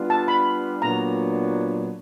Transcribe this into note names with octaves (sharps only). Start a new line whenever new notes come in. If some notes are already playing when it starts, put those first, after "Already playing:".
Already playing: G3 B3 D4 F4
A5
B5
A#2 F#3 B3 D4 A#5